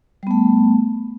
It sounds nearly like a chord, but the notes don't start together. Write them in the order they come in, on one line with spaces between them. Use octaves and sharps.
G3 B3 A3